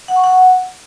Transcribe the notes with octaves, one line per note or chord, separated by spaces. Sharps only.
F#5
C#6
F#5